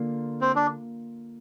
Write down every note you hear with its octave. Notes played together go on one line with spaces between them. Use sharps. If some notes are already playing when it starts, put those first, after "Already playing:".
Already playing: D3 A#3 F4
C4
D4